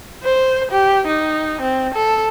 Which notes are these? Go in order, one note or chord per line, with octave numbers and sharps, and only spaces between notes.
C5
G4
D#4
C4
A4